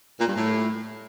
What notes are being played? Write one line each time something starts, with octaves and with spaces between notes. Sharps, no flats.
A#2
G2
A2